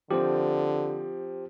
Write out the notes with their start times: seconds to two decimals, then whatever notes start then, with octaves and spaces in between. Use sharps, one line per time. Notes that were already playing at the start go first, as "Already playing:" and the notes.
0.11 D3 F3 C4 G4 C5